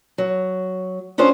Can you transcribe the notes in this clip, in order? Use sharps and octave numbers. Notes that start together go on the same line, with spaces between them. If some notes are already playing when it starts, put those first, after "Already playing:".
F#3
C#4 D4 F4 G#4 C5